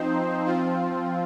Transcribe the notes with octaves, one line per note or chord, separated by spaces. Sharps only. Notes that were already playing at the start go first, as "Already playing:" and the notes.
Already playing: F3 C4 D#4 C5
F3 C4 F4